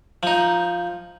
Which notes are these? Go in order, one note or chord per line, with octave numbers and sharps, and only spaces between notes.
F3 D#4